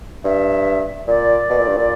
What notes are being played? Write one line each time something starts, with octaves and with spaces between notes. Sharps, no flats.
G2 E5
A#2 D5
B2
A#2
G2
A#2